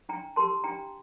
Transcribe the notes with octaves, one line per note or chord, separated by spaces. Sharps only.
D4 G5 A#5
G4 A#4 A5 C6
D4 G5 A#5